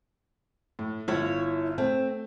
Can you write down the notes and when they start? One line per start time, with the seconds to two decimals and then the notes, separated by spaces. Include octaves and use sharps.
0.79 A2
1.08 G1 E4 F4 C#5
1.78 A3 C4